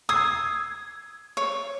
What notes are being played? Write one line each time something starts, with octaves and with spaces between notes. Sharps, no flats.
D#6 E6 G#6 C7
C#5